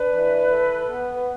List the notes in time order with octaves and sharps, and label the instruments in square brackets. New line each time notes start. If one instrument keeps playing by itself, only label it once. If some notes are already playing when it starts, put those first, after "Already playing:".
Already playing: [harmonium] D4 [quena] B4
[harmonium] E3
A4
B3